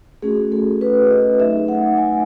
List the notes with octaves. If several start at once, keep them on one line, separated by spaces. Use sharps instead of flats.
A3 C#4 F#4 G#4
A4
B4
D#5
F#3 A3 D#4 E5
F#5
G#5